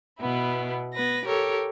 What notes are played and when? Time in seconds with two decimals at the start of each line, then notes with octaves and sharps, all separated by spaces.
0.18 B2 B3 E4
0.94 B3 B4 A#6
1.25 G4 A4 A#4 C#5